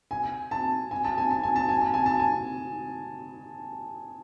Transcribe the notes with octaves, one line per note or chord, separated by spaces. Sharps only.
G#5
A5
G#5
A5
G#5
A5
G#5
A5
G#5
A5
G#5
A5
G#5